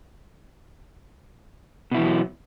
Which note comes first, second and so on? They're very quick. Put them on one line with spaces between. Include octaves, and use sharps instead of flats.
B2 E4 E3 G3 F#3